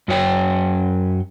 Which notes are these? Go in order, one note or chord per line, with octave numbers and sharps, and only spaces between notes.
F#2 F#3 C#5 G5